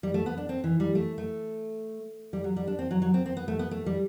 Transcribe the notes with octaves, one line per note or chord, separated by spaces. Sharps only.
G3
A3
B3
D4
C4
E3
G3
A3
A3
G3
F#3
G3
D4
C4
F#3
F#3
C4
C4
B3
A3
B3
A3
G3